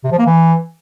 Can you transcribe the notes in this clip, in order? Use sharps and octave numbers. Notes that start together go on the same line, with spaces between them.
C3
F3
A#3
E3